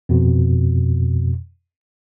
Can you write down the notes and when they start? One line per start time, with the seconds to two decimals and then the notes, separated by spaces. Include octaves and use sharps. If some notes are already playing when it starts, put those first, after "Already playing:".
0.09 F2 B2